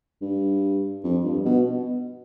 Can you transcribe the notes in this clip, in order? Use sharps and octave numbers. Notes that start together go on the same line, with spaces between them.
G2
F2
G2
B2